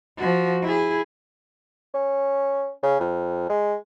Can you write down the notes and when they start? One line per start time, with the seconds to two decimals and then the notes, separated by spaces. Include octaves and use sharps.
0.18 F3 F#4
0.62 E4 G#4
1.94 C#4
2.83 C#3
3.00 F2
3.49 G#3